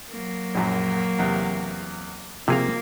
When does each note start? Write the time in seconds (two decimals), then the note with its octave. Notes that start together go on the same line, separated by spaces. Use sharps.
0.10 F#3 A#3
0.55 A#1 F#2
1.19 E2 C3
2.48 C3 F3 A#3 G#4 F5